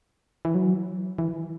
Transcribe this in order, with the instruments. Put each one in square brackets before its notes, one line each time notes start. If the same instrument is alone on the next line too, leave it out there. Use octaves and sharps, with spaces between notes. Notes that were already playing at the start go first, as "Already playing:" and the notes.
[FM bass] E3
F#3
E3